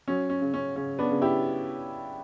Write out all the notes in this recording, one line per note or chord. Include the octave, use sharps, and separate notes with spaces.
F#3 C#4
C#4
C#3
C#4
C#3 C#4
B3 D4
C#3
E4 G4